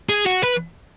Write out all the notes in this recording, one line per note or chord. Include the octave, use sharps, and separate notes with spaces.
G#4
F#4
B4